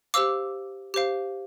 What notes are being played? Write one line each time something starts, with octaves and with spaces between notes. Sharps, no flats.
G4 C5 F5 D6 E6
G4 C5 F5